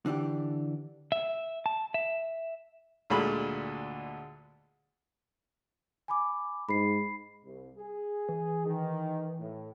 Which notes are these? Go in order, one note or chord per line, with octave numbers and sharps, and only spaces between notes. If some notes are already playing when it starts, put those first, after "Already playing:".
D3 E3 D4 G4
E5
A5
E5
D2 A#2 D3 G#3 B5
G#5 B5 D6
G#2 B5 C7
C2
G#4
E3
D#3
A2